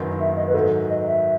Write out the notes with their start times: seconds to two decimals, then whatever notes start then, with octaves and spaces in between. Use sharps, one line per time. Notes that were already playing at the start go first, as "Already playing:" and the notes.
Already playing: F#1 F#2 D#3 F#3 B3
0.19 E5
0.37 D#5
0.48 B4
0.54 G#2 D#3 F#3 B3 E4 A4
0.90 D#5
1.07 E5